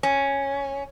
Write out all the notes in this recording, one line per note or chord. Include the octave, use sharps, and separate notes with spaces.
C#4